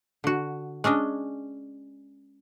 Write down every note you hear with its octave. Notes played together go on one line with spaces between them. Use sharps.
D3 F#4
G#3 C#4 D4 D#5